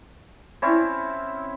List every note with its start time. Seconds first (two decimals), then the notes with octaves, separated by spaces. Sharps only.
0.62 C4 C#4 E4